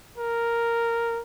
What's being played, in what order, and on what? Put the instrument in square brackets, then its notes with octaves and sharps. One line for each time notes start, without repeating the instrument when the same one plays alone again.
[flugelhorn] A#4